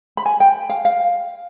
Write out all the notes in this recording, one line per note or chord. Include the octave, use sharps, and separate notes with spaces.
B5
G#5
G5
F5
F5